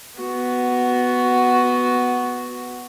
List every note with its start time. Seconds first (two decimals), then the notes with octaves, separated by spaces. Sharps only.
0.19 B3 F#4